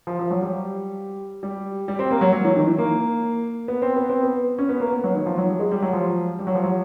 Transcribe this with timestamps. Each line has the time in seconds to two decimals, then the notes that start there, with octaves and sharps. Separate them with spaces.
0.07 F3
0.19 F3
0.31 F#3
0.41 G3
1.43 G3
1.88 G3
1.99 C4
2.11 A#3
2.21 F#3
2.33 F#3
2.44 E3
2.56 D#3
2.67 E3
2.78 A#3
3.68 B3
3.82 C4
3.96 B3
4.09 C4
4.23 B3
4.58 C#4
4.69 B3
4.80 A#3
4.92 B3
5.04 F#3
5.15 D#3
5.26 F3
5.38 F#3
5.49 G3
5.60 G#3
5.71 G3
5.82 F#3
5.93 F3
6.39 G3
6.47 F#3
6.55 F3
6.63 F#3